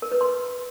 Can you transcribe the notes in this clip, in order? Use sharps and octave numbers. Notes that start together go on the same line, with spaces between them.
A#4
B4
C6